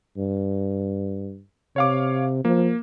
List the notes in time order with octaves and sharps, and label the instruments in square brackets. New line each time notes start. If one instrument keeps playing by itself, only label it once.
[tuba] G2
[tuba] C3 [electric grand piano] C#5 F5 D6
[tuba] F3 [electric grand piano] A#3